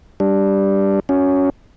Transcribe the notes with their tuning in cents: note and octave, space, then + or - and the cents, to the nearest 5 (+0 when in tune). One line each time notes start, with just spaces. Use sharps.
G3 +0 D4 +0
C#4 +10 F#4 -10